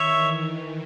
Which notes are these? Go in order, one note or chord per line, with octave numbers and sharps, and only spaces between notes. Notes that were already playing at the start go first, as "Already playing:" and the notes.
Already playing: D#3 C#5 E5
E3